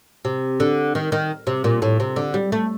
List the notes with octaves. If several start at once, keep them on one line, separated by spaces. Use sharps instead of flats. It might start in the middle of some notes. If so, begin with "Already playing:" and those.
C3
D3
D#3
D#3
C3
A#2
A2
C3
D3
G3
A3